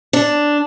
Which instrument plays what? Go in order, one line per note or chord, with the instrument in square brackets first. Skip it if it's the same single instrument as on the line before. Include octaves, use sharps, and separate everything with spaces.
[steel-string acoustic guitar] D4